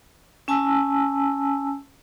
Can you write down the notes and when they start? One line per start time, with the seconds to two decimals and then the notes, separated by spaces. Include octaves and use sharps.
0.48 C#4 G#5 A5 E6